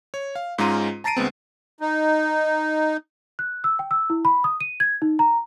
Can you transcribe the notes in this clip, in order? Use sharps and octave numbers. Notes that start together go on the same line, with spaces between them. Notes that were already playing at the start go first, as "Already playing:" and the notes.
C#5
F5
G#2 G#3 C#4 F4 A#5 D#7
A5 A#5 A6 C7 D7 D#7
D2 G#3 B3 C4
D#4
F#6
E6
G5
E6
E4
B5
D#6
D#7
G#6
D#4
A#5